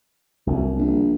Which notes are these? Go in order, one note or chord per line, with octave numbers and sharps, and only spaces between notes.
C2 F#2
A#1